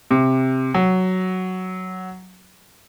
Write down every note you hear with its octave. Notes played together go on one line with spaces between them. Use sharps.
C3
F#3